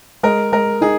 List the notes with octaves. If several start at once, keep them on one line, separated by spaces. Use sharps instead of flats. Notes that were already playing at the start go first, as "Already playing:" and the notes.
G#3 A#4
G#3 A#4
D#4 G#4